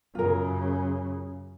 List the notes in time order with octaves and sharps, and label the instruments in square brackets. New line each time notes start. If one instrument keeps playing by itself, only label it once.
[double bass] F#2 C#3 [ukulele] F4 A#4